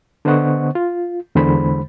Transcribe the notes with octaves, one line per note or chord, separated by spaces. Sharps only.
D3 B3 C5 D#5 F#5 C#6
F4
E2 D3 G#3 C5 B5